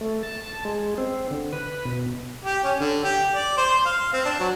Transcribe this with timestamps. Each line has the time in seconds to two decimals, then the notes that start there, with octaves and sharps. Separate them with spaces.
0.01 A3
0.23 A5
0.65 G#3
0.98 C4
1.31 D3
1.53 B4
1.85 B2
2.45 G4
2.64 C#4
2.80 D3
3.04 G4
3.34 D5
3.57 C5
3.71 C6
3.86 F5
4.13 C4
4.25 D4
4.40 F#3